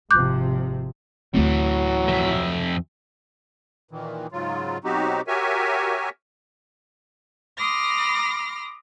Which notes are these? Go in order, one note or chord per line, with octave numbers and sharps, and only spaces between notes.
G#1 C3 F3 D6 F#6 G6
D2 A2 E3 F#3 A3 C4
F2 E5
A#2 D#3 E3
G#2 C#3 F#3 F4
B2 F#3 C4 D#4 F#4 G4
F#4 G4 A#4 C#5 E5 G#5
B5 C6 D6 D#6 F6 A#6